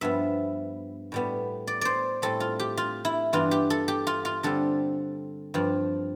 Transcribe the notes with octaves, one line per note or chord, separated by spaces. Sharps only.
G2 F3 B3 E5
A2 G3 B3
D5
C5 D5
A2 G3 C4 A4
F4
G4
F4
E4
G2 E3 B3 D4 F4
G4
A4
G4
F4
F4
D3 G3 C4 A4
G2 F3 C4